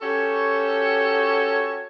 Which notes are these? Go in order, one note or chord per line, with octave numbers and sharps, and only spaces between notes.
C#4 F#4 G4 A4 C#5